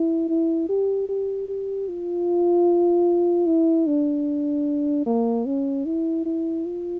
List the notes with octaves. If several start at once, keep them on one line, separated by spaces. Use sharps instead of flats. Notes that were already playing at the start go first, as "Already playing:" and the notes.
Already playing: E4
E4
G4
G4
G4
F4
E4
D4
A#3
C#4
E4
E4
F4